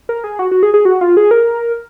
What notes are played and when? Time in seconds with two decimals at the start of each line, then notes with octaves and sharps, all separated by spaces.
0.09 A#4
0.24 G#4
0.39 F#4
0.51 F#4
0.63 G#4
0.74 G#4
0.85 F#4
1.01 F4
1.17 G#4
1.31 A#4